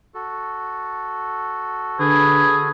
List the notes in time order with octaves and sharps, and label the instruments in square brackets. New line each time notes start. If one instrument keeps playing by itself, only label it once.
[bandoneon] F#4 A4
[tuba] D3 [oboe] G#4 [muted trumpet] B4